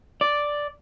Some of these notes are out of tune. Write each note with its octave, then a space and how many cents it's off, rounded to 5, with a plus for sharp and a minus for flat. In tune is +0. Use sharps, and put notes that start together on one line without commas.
D5 +0